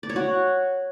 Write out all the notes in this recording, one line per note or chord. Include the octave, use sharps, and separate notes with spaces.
D5
C#5
F#4